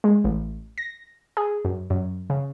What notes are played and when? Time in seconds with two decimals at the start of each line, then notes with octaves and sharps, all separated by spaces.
0.04 G#3
0.24 A1
0.78 A#6
1.37 G#4
1.65 F#2
1.90 F#2
2.30 C#3